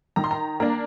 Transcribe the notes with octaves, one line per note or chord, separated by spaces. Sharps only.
D#3 A#5
C6
A#5
A#3 D4 A#5